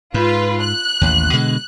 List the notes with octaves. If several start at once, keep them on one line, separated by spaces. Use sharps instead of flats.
G#2 F4 B4
F#6
A1 D#2
B2 D3 G#3